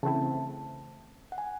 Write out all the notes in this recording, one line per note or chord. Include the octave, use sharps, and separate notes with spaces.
C#3 E3 A3 C4 E4 A5
F#5
G#5